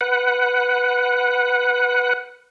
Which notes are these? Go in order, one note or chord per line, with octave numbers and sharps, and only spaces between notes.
B4 F#5